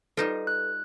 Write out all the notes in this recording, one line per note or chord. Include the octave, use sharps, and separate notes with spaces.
G3 D#4 F4 A4 B4
F#6